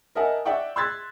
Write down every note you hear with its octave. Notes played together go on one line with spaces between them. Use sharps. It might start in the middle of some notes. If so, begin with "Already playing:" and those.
A#4 D#5 E5 F#5 G#5 A5
D5 E5 F#5 G5 C#6
C6 E6 F#6 G#6 A6 B6